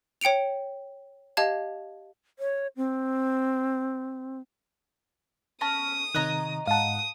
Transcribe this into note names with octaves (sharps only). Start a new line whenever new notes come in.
C#5 G5 C#7 D7 F7
G4 D#5 F5 A5 G#6
C#5
C4
C#4 A5 D#6 A#6
C3 D#3 C#5 D#5 A#5 F#6
G#2 F5 F#5 A5 D#6